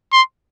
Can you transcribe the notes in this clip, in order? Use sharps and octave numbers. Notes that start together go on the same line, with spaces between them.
C6